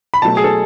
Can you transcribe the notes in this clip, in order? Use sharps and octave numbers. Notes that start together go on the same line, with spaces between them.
B5
B2 F#3 A3 A5
G#4
A4